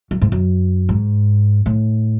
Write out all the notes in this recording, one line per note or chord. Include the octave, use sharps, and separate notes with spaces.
F#2
G#2
F#2
G#2
A2